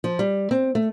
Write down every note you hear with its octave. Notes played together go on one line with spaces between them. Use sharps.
F3
G3
C4
A3